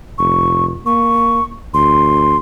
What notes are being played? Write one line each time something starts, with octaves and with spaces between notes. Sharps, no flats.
F1 C#6
A#3 C#6
D2 C6